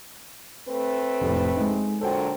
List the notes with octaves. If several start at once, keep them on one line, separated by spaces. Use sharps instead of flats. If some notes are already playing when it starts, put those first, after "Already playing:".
A3 C4 B4
F1 A2
G#3 D#4
A#2 D3 F#3 A4 C5 G5